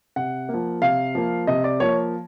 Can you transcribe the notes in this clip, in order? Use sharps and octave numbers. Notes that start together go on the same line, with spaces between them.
C3 F#5
F3 A#3
C3 F5
F3 A#3
C3 D#5
D5
F3 A#3 C#5